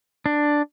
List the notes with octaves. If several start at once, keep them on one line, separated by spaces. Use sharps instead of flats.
D4